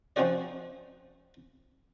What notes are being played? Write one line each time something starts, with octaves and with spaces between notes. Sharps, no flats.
F3 C4 C#4 D#4 F#4 D5